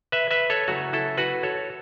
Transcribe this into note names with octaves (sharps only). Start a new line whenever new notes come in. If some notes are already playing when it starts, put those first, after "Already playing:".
B4 E5
B4 E5
A4 C#5
C#3 F#3 A3 E4 F#4
E4 A4
F#4 B4
A4 C#5